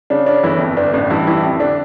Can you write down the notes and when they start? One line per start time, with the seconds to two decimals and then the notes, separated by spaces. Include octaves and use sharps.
0.10 C#3 D4
0.26 C#4 D4
0.43 G1 E3 E4
0.61 F2
0.77 G1 D4
0.93 A1 D4
1.10 G2 E3 E4
1.27 A1 E3 E4
1.43 F2
1.60 D3 D4